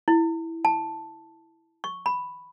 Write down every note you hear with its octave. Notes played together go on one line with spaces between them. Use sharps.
E4
A5
C#6
B5